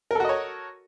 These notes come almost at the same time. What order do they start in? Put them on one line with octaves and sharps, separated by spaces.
A#4 A4 F#4 D#5 C#5